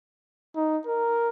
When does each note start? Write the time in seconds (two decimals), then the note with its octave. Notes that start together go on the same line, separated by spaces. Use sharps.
0.56 D#4
0.86 A#4